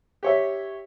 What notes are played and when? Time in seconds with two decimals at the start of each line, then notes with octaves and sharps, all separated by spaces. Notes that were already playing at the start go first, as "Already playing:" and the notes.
0.23 G4 C#5 E5